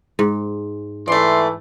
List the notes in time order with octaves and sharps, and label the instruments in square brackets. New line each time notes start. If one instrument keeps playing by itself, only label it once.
[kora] G#2
[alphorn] E3 [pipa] A3 D5 [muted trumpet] C6